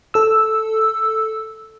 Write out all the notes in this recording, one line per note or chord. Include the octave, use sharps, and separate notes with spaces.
A4 E6